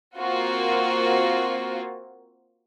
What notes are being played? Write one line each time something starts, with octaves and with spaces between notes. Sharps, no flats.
A#3 C4 F4 F#4